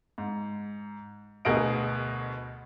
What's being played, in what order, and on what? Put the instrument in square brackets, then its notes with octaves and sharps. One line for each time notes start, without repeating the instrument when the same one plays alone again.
[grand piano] G#2
D2 B2 G#4 A#4 D#5 D7